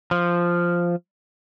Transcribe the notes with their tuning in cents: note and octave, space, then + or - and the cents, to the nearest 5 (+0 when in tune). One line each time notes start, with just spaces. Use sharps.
F3 -5